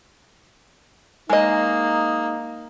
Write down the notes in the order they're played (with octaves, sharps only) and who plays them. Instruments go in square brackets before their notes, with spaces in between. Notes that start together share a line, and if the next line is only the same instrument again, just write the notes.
[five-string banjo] G#3 D#5 [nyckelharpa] A#3 [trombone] D#4